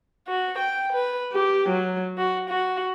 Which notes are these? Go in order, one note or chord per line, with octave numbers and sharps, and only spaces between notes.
F#4
G5
B4
G4
F#3
F#4
F#4